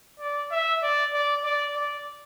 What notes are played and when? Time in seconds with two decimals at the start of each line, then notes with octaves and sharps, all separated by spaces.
0.20 D5
0.51 E5
0.83 D5
1.13 D5
1.45 D5
1.76 D5